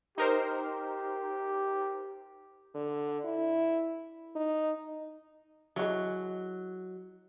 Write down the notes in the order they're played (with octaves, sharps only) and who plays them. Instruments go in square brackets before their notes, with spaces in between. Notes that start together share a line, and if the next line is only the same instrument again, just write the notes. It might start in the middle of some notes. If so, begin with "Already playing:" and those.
[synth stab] D#4 A#4 C5 [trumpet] G4
[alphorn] D3
E4
D#4
[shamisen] E3 G#3 [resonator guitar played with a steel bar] F#3